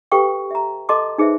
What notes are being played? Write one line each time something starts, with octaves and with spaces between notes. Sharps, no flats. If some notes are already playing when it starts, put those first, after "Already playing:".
G4 A4 B4 F5 G5 C#6
E5 A#5
A4 D#5 A5 C6 D6
D#4 G#4 B4 C5 E5